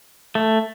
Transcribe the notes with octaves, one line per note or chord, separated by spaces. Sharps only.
A3